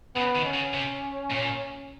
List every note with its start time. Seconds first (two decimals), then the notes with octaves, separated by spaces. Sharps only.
0.16 C#3 B3
0.35 D#3
0.44 C#4
0.54 C#3
0.73 C3
1.30 A#2